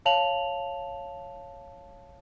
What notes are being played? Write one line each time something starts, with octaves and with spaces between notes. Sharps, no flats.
C#5 F5 A5 F7 F#7